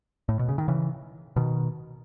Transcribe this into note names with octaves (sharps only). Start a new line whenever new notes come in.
A2
B2
C#3
D#3
C#3 E3
B2 D#3